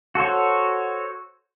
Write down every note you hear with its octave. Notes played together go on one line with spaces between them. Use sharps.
F#4 A4 C5 C#5